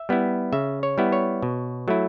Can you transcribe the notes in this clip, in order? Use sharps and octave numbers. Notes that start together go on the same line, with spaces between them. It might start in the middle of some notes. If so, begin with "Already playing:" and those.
Already playing: E5
G3 B3 E4
C#3 E5
C#5
G3 B3 E4
C#5
B2
F#3 A3 E4